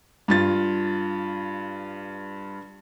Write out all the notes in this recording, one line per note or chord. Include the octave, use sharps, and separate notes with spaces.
G2 F4 A6